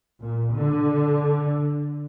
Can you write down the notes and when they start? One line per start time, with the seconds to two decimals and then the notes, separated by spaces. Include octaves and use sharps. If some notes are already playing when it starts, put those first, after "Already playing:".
0.20 A#2
0.54 D3